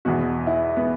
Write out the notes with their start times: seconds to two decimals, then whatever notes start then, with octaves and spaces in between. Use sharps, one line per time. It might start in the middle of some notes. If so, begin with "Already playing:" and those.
0.05 E2 B2 F#4
0.47 E4
0.77 B3